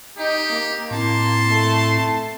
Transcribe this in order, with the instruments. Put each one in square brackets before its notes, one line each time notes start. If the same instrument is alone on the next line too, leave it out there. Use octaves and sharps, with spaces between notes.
[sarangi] D#4 [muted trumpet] G4
[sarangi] A#3
[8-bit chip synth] A2 C4 E4 [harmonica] A5 [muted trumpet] C6
[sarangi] A3